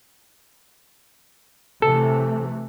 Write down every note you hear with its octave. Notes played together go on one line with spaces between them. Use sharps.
C3 E3 A3 A4